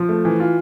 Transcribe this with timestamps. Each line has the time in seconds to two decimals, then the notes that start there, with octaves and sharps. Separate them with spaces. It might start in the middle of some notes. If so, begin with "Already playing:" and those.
Already playing: F3
0.09 A3
0.25 E3
0.40 F4